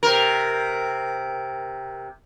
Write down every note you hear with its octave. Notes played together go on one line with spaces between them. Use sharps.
C3 A#4